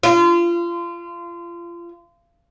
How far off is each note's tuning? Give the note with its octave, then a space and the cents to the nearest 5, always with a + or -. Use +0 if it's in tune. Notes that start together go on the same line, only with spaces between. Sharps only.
F4 -30